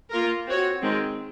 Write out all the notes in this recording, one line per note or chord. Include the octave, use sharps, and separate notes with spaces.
A#3 F4 A#4
C4 F#4 C#5
D#3 G#3 C4